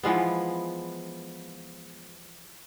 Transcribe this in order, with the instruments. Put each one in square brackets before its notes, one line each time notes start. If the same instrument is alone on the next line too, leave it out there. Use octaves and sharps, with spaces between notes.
[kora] E3 F3 G#3 B3